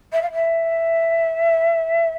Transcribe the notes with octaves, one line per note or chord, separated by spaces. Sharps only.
E5
F5
E5